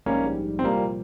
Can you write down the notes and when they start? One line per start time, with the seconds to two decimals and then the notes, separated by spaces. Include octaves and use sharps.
0.06 A#1 G#2 G3 A#3 C#4
0.59 C4
0.64 C2 A#2 F3 G3 A#3